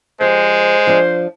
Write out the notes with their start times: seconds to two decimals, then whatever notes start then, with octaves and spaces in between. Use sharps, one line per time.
0.21 F3 G#3 G4 C5
0.87 F3 D4